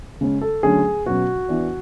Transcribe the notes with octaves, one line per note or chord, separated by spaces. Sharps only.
C#3 G#3 C#4
A4
D3 F#3 A3 C#4 G#4
B2 F#3 C#4 F#4
E3 B3 D4